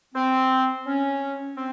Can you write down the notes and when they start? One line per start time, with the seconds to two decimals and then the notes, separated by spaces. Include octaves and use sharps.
0.14 C4
0.86 C#4
1.57 C4